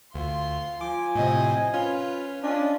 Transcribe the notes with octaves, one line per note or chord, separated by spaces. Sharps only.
D2 F4 C6
F3 G#5 D6
A2 C3 C5 D#5
C#4 F4 B4
C#4 D4 F4 D#5